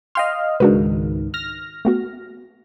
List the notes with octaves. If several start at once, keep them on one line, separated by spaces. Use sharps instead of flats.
D#5 F5 G5 C6 F6
C#2 G#2 D#3 D4 F#4 B4
F6 A#6
A3 B3 F#4